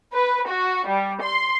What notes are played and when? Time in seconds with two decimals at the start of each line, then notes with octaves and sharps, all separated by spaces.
0.15 B4
0.49 F#4
0.87 G3
1.22 C6